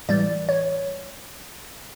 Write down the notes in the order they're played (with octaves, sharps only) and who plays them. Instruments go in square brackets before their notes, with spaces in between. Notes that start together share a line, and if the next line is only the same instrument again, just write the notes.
[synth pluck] A2 E3 G3 D5
C#5